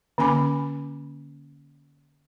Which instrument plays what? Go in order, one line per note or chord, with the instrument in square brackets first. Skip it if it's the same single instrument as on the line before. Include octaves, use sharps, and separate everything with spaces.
[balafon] D3 A#3 C#4 G#5 B5 D6